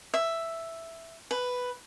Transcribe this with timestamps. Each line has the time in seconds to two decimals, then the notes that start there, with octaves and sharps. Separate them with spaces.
0.14 E5
1.31 B4